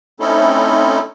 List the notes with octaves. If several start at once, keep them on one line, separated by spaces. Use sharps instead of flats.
A3 C4 C#4 D#4 E4 A4